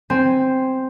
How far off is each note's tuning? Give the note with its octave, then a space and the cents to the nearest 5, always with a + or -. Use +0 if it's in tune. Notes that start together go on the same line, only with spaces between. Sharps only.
C4 +0 G#5 +0